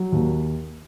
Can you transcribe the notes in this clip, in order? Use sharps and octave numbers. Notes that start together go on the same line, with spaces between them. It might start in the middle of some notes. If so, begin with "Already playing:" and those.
Already playing: F#3
D#2